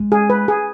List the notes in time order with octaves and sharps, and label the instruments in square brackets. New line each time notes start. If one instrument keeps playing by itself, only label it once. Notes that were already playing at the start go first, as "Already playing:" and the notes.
Already playing: [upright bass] G#3
[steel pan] G#4
B4
G#4